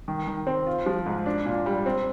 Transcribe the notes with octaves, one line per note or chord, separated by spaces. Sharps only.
D#3
D#3
C4
F4
F3
G#2
D4
A#2
G3
C4